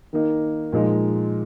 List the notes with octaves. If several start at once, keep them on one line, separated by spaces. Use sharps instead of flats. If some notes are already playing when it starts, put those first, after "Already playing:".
D#3 A#3 D#4
A#2 F3 G#3 D#4